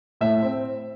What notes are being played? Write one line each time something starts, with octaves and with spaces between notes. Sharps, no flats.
A2 E5
C4